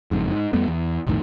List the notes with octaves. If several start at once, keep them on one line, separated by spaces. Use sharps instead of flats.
F#1 F2 G#2
G#2
F2 G3 A3 B3
E2
B1 F2 A2 D#3